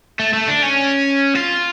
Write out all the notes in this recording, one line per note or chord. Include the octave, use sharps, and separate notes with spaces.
A3
A3
D4
C#4
F4